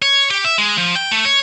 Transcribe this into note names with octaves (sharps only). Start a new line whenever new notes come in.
C#5
G4
E5
G#3
F3
G5
A3
C#5